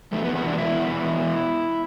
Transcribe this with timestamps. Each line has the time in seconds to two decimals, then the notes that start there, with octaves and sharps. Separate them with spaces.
0.12 E2 A3
0.24 B3
0.27 E2
0.36 B3
0.43 B2 D4
0.58 B2 E4
0.73 E2
0.88 E2
1.04 B2